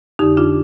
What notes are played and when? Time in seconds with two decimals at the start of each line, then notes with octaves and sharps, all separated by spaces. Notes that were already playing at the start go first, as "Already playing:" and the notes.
0.19 F2 D3 D#4 G4
0.37 D4 F4